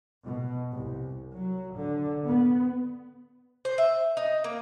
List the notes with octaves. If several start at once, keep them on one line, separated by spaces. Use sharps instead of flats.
B2
C2
F#3
D3
B3
C5
E5
D#4
A#3